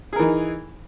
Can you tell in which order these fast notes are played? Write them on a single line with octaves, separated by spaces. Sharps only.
G#4 A#4 E3 D#4